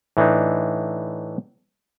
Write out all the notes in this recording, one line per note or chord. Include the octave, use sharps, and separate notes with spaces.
A2 E3 D4 D#4